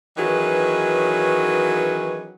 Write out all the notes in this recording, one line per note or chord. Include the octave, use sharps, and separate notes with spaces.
D#3 E3 F#3 C#4 G#4 B4